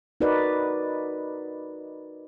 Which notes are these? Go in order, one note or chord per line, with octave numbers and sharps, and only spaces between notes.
D#4 F#4 A#4 B4 D5 D#5